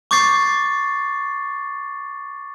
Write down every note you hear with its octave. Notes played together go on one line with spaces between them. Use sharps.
C#6 D6 G6 A6 C7